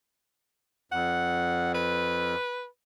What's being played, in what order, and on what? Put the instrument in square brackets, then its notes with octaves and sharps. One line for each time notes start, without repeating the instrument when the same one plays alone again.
[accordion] F2 [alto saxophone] F#5
[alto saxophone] B4